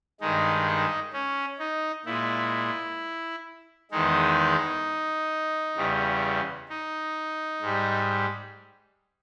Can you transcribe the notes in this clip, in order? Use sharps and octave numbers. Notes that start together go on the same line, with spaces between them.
G2 D#3 G#3 D#4
D#4
C#4
D#4
A#2 G#3 E4
E2 D#3 G#3 D#4
E2 C#3 G3
D#4
G#2 G3